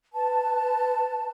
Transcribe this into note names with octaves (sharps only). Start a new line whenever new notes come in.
B4 A5